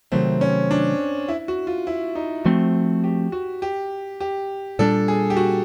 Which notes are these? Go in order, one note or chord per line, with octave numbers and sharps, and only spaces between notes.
C3 D#3 F#3 A3 C4
C#4
D4
E4
F#4
F4
E4
D#4
F3 A3 C4 F#4
G4
F#4
G4
G4
A#2 G3 B3 D4 A4
G#4
G4
F#4